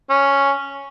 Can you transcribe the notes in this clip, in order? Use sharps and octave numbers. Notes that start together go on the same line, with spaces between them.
C#4